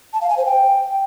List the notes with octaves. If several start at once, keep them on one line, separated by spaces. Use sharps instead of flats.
A5
F5
G#5
C5
G5